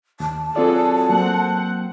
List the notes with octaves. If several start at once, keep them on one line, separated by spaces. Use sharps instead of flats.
D#2 A5
F#3 C4 F4 G#4 A4 D5
F#3 A#3 C4 F#5